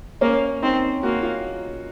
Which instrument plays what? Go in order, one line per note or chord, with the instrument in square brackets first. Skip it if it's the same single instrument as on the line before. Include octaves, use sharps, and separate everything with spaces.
[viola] A#3 [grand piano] C#4
[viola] C4 [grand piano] D#4
[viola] A#3 [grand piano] F#4
[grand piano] F4